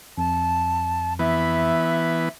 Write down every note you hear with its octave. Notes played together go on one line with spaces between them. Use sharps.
F2 A5
E3 B3 E5